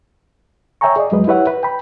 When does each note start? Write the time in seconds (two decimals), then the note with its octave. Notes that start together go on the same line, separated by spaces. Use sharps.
0.81 C#5 E5 G5 G#5 A#5 C#6
0.96 G#4 D5 D#5
1.11 F2 F#3 G#3 B4 D#5
1.27 E4 G4 B4 C#5 E5 F#5
1.47 B4
1.63 G5 B5